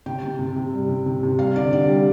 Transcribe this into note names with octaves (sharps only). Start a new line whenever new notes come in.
C3 G5
C3
C3
C3
G3
C3
C3
C3
G3 F5
D3 D5
D3 D5
G3